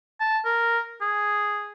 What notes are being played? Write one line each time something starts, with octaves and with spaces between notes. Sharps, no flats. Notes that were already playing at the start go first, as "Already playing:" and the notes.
A5
A#4
G#4